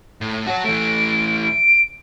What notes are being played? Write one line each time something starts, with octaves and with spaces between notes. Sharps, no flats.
A2
F#4 C#5 A5
E3 A3 D7
D7